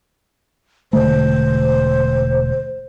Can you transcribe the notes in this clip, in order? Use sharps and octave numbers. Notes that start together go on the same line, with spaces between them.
E1 D3 A3 C5